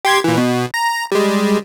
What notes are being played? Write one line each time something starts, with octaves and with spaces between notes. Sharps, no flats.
G4 C6 G#6
A#2 E3
B2
A#5
G3 G#3